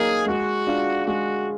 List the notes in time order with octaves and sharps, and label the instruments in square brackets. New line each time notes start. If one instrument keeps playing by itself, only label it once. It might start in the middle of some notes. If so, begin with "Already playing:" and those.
Already playing: [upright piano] F#3 A#3 D#4 A#4 [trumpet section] G#4
[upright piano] G#3 [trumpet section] F#4
[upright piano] D4 F4
[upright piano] G#3 [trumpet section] F#4